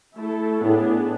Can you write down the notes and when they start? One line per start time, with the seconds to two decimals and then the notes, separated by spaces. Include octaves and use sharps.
0.16 A3 E4 A4
0.61 A2 B3 D4 G#4